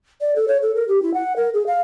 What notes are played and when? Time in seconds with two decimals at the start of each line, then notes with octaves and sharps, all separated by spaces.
0.21 D5
0.36 A4
0.48 C#5
0.62 A4
0.75 A#4
0.88 G4
1.03 E4
1.14 F#5
1.36 A#4
1.54 G#4
1.67 F5